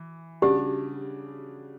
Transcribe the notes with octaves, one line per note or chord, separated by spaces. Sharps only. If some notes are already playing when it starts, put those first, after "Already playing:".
Already playing: E3
C#3 G3 D4 F#4 G4